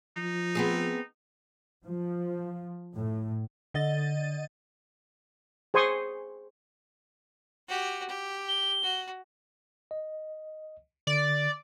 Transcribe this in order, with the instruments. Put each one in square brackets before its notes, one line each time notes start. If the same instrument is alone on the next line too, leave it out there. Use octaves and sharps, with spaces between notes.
[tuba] F3 [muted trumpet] D#4
[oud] B3 C4 G#4
[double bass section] F3
A2
[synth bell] D3 D#5 A6
[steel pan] G#4 C5 G#5 C6 C#6 D#6
[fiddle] F#4 G4
G4
[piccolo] G7
[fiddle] F#4
[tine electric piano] D#5
[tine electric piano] D3 [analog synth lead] D5